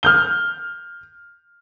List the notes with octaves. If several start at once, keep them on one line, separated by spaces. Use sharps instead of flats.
F6 G6 G7